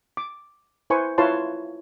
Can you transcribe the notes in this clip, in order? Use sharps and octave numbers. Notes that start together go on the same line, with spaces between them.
D6
E4 B4 C5 G#5 C#6
E4 F4 B4 C#5 A5 C6